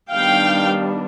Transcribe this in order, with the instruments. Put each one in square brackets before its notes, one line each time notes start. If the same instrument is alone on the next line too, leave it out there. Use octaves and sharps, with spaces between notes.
[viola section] D#3 G3 B3 D4 F5 G5